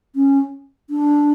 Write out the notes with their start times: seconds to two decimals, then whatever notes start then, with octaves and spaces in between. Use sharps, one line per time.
0.16 C#4
0.90 D4